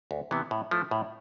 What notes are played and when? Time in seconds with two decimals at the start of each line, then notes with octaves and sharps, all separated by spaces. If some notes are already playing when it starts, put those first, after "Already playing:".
0.11 D2
0.31 C3 E3 B3
0.51 A2
0.71 F3 A3 E4
0.91 A2